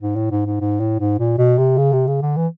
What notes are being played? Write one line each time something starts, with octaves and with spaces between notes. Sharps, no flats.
G#2
A2
G#2
G#2
G#2
A2
G#2
A#2
B2
C3
C#3
C3
C#3
D3
E3